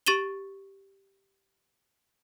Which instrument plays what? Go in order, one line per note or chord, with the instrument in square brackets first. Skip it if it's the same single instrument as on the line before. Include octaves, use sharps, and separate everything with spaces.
[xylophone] G4 C#6 A6 D#7 E7 G7